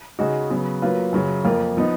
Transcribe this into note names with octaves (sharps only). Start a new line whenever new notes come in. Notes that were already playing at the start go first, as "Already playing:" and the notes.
C#3 G#3 D#4 F#4
C#3 F#3 B3
F#3 A#3 F4 B4
F#2 C#3 F#3
F2 F3 A#3 F4 A#4
F3 B3 D#4